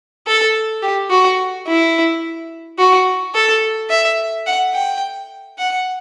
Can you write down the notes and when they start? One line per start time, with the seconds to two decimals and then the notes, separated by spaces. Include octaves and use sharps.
0.27 A4
0.82 G4
1.10 F#4
1.67 E4
2.78 F#4
3.35 A4
3.90 E5
4.46 F#5
4.74 G5
5.58 F#5